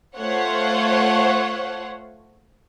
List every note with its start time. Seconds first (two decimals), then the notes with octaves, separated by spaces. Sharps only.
0.17 A3 F4 C5 C#5 F#5